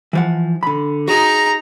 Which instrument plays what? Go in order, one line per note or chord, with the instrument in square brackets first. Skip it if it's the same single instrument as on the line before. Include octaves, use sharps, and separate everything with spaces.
[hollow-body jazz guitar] E3 F3 F#5
D3 B5
[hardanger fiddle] D#4 A#5 [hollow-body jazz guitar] F#4 G#4